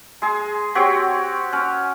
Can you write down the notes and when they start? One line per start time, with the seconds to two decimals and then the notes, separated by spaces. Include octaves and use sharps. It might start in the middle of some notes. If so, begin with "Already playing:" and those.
0.22 G#3 G#4
0.75 C4 F#4 G4 C#5
1.53 C#4